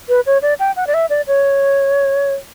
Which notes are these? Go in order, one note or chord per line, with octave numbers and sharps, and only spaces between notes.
B4
C#5
D5
G5
F#5
D5
E5
D5
C#5